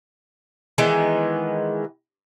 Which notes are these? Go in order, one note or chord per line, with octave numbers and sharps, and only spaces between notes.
D#3 E3 G#3 B3